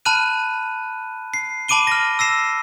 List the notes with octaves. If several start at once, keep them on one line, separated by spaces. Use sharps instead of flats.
A5 B5 F6 F#6 D#7
C7
A5 B5 D6 D7 D#7 G7
F6 A#6
E6 A#6 C7 E7